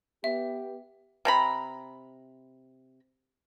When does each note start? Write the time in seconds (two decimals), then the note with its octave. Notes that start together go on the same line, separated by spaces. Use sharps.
0.24 B3 G4 E5
1.25 C3 A#5 B5